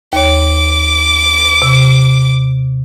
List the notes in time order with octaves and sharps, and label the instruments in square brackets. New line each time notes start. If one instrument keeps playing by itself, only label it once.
[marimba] D#2 C#5 [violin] D6
[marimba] C3